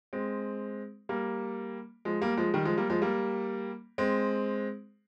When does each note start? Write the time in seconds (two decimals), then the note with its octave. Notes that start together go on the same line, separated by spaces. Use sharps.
0.13 G#3 C4
1.09 G3 A#3
2.05 F3 G#3
2.21 G3 A#3
2.37 F3 G#3
2.54 D#3 G3
2.65 F3 G#3
2.77 G3 A#3
2.90 F3 G#3
3.02 G3 A#3
3.98 G#3 C4